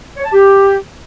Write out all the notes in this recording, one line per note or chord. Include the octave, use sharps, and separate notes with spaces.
C#5
A5
G4